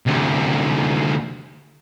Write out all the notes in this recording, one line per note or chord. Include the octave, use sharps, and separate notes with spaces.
D2 C3